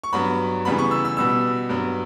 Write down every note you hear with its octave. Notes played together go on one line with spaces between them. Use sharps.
C#6
G2 F#3 B3 B5
C#3 E3 G3 B3 B5
C#6
E6
E6
B2 G3 B3 E6
G2 F#3 B3